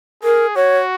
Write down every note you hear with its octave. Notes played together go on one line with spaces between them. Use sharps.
G#4 A#4
F#4 C#5